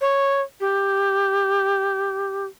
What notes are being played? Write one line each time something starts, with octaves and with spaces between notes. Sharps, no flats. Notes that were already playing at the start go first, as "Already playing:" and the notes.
C#5
G4